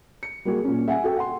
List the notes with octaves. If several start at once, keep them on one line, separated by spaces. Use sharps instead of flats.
C#7
G3 A#3 F#4 G#4
A#2 C#4
E5 F#5 G#5
F#4 A4 G5
F#5 C6